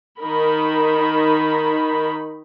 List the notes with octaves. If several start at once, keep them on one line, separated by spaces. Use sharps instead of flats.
D#3 D#4 A#4 B5